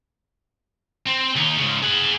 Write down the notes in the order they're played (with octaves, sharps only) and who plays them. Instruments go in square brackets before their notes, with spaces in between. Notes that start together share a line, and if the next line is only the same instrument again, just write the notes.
[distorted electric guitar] C4
D#2 D#4
G#2 C#3
G#4 F#5